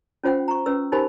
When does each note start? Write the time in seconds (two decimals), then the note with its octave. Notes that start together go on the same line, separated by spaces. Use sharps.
0.24 C#4 F4 C5 F#5 G5
0.48 A#5 C#6
0.66 C#4 B4 E6
0.92 D#4 G4 A#4 C5 G#5 B5